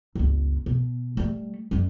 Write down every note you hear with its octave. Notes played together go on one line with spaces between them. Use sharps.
G1 C#2
B2
G3 A3
F#2 G3